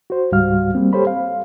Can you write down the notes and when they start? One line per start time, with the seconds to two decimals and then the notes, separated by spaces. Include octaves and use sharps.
0.10 F#4 C5
0.32 C#2 G#2 G3 F#4 F5 F6
0.75 G3 A#3 C4
0.93 G4 A4 C5 C#5 B5
1.07 F5